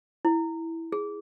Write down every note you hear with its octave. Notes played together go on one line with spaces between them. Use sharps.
E4
G#4